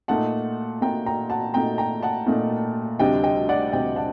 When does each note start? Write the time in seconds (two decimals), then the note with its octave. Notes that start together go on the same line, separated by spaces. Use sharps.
0.08 A#2 A3 D#4 F#5 A5
0.81 A#2 A3 D#4 G5 A#5
1.06 G5 A#5
1.30 F#5 A5
1.54 A#2 A3 D#4 G5 A#5
1.78 G5 A#5
2.03 F#5 A5
2.27 A#2 A3 D#4
2.99 D2 C3 G3 D4 D#5 G5
3.24 D#5 G5
3.49 D5 F#5
3.72 D2 C3 G3 D4 D#5 G5
3.96 F#5 A5